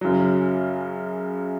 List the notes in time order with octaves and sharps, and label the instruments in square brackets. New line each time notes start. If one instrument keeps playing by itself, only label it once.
[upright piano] F#2 C#3 F#3